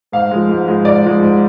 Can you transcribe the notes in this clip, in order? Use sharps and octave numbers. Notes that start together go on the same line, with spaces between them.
G#2 F5
F3 G#3
G#2
F3 G#3
G#2 D5
F3 G#3
G#2